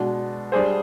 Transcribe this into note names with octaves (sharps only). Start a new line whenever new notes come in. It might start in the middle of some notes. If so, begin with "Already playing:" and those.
Already playing: B2 G#3 D4
G3 D4 G#4 C5